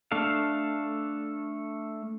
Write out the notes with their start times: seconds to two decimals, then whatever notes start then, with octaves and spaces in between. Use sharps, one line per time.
0.12 A3 D4 A4 F5